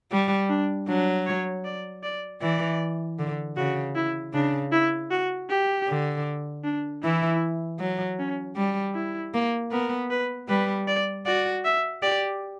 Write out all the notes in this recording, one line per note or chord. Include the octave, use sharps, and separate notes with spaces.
G3
D4
F#3 D4
C#5
D5
D5
E3 D5
D3
C#3 F#4
E4
C#3 D4
E4
F#4
G4
D3
D4
E3 E4
F#3
C#4
G3
E4
A#3
B3 A#4
B4
G3 B4
D5
F#4 D5
E5
G4 D5